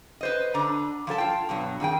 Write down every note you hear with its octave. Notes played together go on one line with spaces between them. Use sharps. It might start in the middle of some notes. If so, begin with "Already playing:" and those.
B4 C5 D#5
D3 A#5
F3 F#3 A4 A5
F4 G5
G2 B2 F#3
F2 D#3 G#4 G5